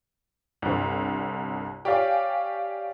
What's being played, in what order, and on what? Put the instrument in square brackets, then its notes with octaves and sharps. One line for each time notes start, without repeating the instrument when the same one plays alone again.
[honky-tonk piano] G1 C2
G4 C#5 D5 F5 G5 G#5